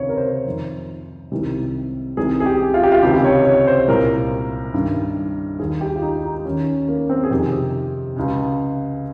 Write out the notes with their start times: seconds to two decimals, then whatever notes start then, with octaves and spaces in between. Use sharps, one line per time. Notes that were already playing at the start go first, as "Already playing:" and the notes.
Already playing: C#2 C3 D#3 C#5
0.09 A#4
0.17 C5
0.46 F2 D#3
1.32 C2 C3 D#3
2.17 C2 C3 D#3 G#4
2.40 G#4
2.46 G4
2.74 F4
2.84 G4
2.92 F4
3.03 C#2 C3 D#3 G4
3.24 C#5
3.45 C#5
3.67 C5
3.88 C2 A#2 A#4
4.74 G2 D#3
5.59 D#2 D#3 G#4
5.81 G4
5.96 F4
6.02 D#4
6.24 D#4
6.37 D#4
6.45 D#2 D#3 C#4
6.89 A#3
7.10 C4
7.24 G#4
7.31 F2 C3 D#3 G4
8.16 C#2 C#3